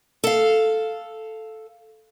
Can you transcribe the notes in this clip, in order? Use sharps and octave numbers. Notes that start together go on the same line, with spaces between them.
A4 F5